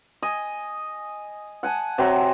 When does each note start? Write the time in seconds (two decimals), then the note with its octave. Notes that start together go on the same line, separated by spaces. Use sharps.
0.22 D#5 G#5
1.63 F#5 G#5 A5
1.98 C3 F#3 C4